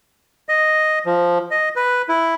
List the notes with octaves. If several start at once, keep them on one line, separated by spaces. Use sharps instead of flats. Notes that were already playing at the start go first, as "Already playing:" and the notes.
D#5
F3
D#5
B4
E4